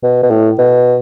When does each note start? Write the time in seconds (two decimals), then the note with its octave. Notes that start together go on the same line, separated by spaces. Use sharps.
0.03 B2
0.23 B2
0.30 A2
0.59 B2